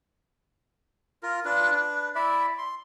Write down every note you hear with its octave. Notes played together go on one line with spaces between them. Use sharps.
F4 A#4
D4 F4 B4
D4 B4
E4 D5 E5
C6